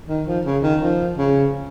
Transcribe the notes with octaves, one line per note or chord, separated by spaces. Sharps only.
D#3
F3
C#3
D#3
F3
C#3